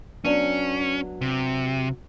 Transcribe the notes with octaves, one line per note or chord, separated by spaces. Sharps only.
F#3 B3 C#4 D4
C3